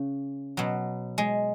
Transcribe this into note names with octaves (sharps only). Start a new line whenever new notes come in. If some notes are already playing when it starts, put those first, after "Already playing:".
Already playing: C#3
B2 F#3
G#3